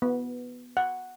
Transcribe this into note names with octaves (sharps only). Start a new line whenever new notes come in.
B3
F#5